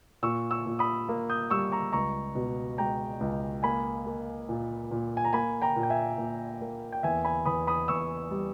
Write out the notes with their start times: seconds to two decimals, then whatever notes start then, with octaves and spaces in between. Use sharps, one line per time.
0.23 A#2 C#6 E6
0.51 C#6 E6
0.66 A#2
0.79 B5 D#6
1.09 A#3
1.30 D#6 G6
1.50 G3 C#6 E6
1.72 A#5 C#6
1.93 C#2 A#5 C#6
2.35 B2
2.78 G#3 G5 A#5
3.20 C#2
3.63 A#3 G#5 B5
4.06 A#3
4.49 A#2
4.91 A#2
5.17 G#5
5.25 A#5
5.33 A#3 G#5 B5
5.62 G5 A#5
5.76 A#2
5.83 G5
5.90 E5 G#5
6.18 A#2
6.61 A#3
6.92 G5
7.03 E2 E5 G#5
7.25 G#5 B5
7.46 E2 B5 D#6
7.67 B5 D#6
7.88 E2 C#6 E6
8.31 G3